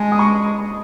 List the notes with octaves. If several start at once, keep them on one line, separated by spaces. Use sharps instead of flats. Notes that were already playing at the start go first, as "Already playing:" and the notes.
Already playing: G#3 G#5 A5
D#6
C#6